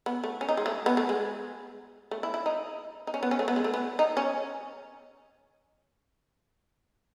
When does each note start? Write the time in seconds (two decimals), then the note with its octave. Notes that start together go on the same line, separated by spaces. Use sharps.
0.06 B3
0.24 A3
0.41 C#4
0.49 D#4
0.57 G#3
0.66 A3
0.86 B3
0.97 A3
1.09 G#3
2.11 A3
2.23 E4
2.34 E4
2.46 D#4
3.07 D#4
3.14 C#4
3.23 B3
3.31 C#4
3.39 A3
3.48 B3
3.56 G#3
3.64 A3
3.74 B3
3.99 D#4
4.17 C#4